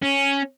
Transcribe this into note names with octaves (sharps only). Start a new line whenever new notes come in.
C#4